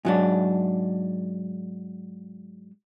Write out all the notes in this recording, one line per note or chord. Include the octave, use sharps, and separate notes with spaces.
G#2 F#3 D4